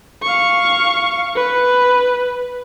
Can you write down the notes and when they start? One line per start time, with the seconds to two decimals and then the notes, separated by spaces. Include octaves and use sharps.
0.22 F5 C#6
1.35 B4